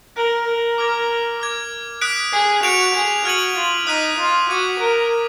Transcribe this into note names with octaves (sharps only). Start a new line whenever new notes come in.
A#4 F#6 D7 F#7
A#4
D6 F6 G#6
D6 F6 G#6
D#6 F#6 B6 D7
G#4
F#4 F#6 D7 F7
G#4
F#4 F6 G#6 D#7 F#7
F4
D#4 D#6 F#6 B6 D#7 F#7
F4
F#4 D6 G#6 D#7 F#7
A#4
G#6 B6